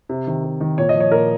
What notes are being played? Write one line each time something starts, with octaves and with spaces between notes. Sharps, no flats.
C3
D#3
C3
D#3
A#2 C#5
D#5
F3
C#5
A#2 A#4